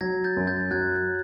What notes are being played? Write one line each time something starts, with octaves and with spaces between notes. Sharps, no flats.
F#3 G#6 A#6
G6 A6
F#2
G6 A6
F#3 F#6 G#6